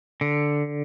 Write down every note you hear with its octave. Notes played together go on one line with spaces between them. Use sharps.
D3